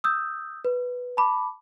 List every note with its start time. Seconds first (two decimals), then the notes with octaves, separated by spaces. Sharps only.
0.04 D#6 E6 G6
0.65 B4
1.17 A5 B5 D6